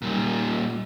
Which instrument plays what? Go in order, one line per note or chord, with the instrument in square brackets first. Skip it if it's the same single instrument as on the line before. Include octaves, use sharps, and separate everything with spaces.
[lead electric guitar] A#2 G3